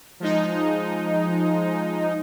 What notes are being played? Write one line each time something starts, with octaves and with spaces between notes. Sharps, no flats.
F3 G#3 D#4